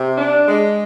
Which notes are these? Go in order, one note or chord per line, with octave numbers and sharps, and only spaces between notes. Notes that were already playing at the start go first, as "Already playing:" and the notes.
Already playing: C3
D4
G#3